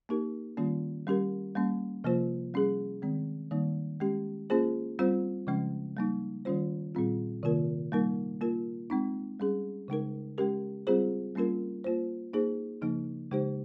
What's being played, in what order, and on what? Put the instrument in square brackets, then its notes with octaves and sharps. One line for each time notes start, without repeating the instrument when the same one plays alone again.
[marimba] A#3 D#4 G4 A#4
D#3 G3 A#3 C#4 F4
G3 C#4 G4 A#4
G3 A#3 C#4
C3 F3 A#3 F4 C5
G3 C#4 G#4
D#3 G#3 C4
D#3 G3 A#3 D#4
G#3 C#4 G4
A#3 C#4 F4 G#4 C5
G3 C4 F4 C5
C#3 F3 G#3 C#4
G3 A#3 D#4
D#3 G3 C#4 F4 C5
A#2 G3 C4 F4
C3 D#3 A#3 F4 A#4
G3 A#3 D#4 A#4
A#3 F4 A#4
G#3 C4 D#4
G3 C#4 G#4
C#3 G#3 D#4 A#4
G#3 C#4 G4 A#4
G3 C4 F4 G#4 C5
G3 A#3 C#4 F4 A#4
A#3 F4 C5
A#3 D#4 G#4 C5
C#3 F3 A#3 D#4
C#3 G#3 D#4 G4 C5